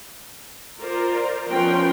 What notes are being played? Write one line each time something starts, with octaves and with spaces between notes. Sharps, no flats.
F4 A#4 C5 D5
F3 B3 C#4 A#4 G5 C6